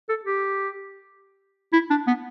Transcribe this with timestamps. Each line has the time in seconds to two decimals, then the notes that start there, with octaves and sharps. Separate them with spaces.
0.09 A4
0.25 G4
1.73 E4
1.90 D4
2.07 B3